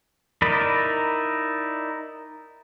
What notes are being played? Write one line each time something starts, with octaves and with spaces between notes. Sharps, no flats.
D#4 E4 A#4 D5 B5